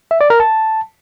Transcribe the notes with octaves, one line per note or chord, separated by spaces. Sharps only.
E5
D5
A#4
A5